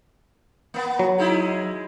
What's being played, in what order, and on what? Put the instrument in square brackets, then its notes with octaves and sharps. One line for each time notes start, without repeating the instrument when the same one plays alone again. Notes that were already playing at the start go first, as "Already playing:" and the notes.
[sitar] A#3 B3
[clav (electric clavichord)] F#3
[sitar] G#3 D#4 E4